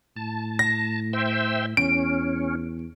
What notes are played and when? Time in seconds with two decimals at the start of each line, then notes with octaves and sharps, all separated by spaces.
0.16 A2 A5
0.59 A#6
1.13 C5 E5 G5
1.77 E2 C#4 D7